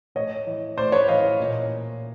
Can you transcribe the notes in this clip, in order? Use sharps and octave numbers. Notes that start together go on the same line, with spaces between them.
A2 C#5 D#5
E3
A2 C5 D5
B4 C#5
E3 D#5 F5
A#2